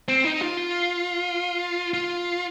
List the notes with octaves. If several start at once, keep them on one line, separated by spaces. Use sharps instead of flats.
C4
D#4
F4
F4